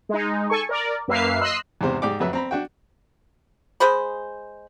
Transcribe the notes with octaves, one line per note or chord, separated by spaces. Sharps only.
G#3 D#4
A4 G#5 C#6
A#4 D5
F#2 A#3 B4 E5 F5 C7
D#5 C6 E6 F#6 C7
E2 G#2 C3 C5
G#2 G4 D5 D6
F2 F#3 B4 E5
C4 A#5 B5
D4 F#4 G5
G#3 G#4 C5 B5